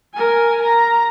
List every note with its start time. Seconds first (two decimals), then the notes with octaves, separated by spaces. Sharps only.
0.14 A#4 G#5
0.63 A#5